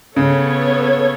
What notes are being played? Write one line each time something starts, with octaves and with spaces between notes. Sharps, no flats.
C#3 B3 A4 C#5